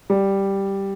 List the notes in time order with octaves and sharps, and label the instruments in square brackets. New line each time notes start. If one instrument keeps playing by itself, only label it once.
[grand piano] G3